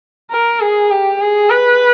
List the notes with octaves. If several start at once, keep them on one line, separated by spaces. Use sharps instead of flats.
A#4
G#4
G4
G#4
B4